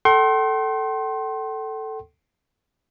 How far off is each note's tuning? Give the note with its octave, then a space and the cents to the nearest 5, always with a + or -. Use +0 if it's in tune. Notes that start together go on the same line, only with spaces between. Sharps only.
A4 +0 G5 -45 C6 +25